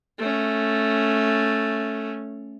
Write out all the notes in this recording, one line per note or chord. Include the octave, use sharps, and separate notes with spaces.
A3 C#4